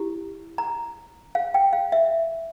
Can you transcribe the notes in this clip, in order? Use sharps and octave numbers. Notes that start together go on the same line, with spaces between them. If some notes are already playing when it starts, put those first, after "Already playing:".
Already playing: E4 G4
A#5
F5
G5
F5
E5